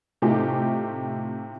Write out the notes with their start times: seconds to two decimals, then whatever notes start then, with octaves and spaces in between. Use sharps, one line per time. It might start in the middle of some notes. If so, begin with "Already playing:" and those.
0.22 A2 C3 A3 D#4 F4 G4